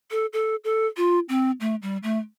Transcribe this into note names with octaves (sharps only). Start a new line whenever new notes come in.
A4
A4
A4
F4
C4
A3
G3
A3